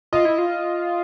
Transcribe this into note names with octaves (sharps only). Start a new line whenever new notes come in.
F4 D#5
E4
F4